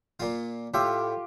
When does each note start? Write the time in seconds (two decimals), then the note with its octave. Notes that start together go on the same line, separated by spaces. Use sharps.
0.20 A#2 F4
0.74 A2 F4 G4 E5